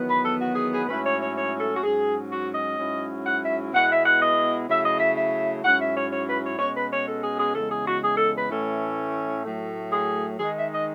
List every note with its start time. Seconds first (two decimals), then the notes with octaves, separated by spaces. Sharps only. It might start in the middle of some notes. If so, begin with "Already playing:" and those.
Already playing: E2 D#3 F#3 B3
0.09 B4
0.24 A4
0.39 F#4
0.55 G#4
0.72 G#4
0.87 G#2 F#3 A3 C#4 E4 B4
1.04 C#5
1.20 C#5
1.35 C#5
1.59 A4
1.74 F#4
1.82 G#2 F#3 C#4 G#4
2.31 F#4
2.54 D#5
2.79 G#2 F#3 C#4 E4
3.26 F#5
3.42 E5
3.73 B2 G#3 B3 E4 F#5
3.90 E5
4.06 F#5
4.21 D#5
4.68 C#3 F#3 A3 E4 E5
4.84 D#5
5.00 E5
5.16 E5
5.63 G#2 F#3 C#4 E4 F#5
5.80 E5
5.96 C#5
6.12 C#5
6.27 B4
6.44 C#5
6.58 B2 G#3 C#4 C#5
6.75 B4
6.91 C#5
7.06 A4
7.22 G#4
7.38 G#4
7.54 E2 C#3 G#3 A4
7.69 G#4
7.86 F#4
8.02 G#4
8.17 A4
8.34 B4
8.49 A2 E3 A3 C#4 E4 A4
9.45 A2 F#3 A3
9.92 G#4
10.39 D#3 G#3 D#4 G#4
10.55 E5
10.72 D#5